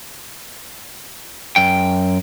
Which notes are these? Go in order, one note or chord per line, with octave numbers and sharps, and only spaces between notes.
F#2 G5